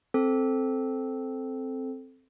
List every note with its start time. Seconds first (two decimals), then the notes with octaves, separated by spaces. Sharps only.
0.14 C4 A4